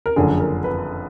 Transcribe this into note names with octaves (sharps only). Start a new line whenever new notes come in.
A#4
F#1 F2 D3 G#4
A#4
B4